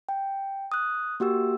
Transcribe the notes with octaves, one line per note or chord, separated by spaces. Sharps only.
G5
D#6 F#6
A#3 F#4 G4 E6